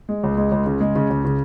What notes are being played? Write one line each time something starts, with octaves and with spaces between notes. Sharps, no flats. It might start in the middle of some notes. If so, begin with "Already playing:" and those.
G#3
C#2
G#3
C#2
C#3
G#3
C#3
C#2
C#3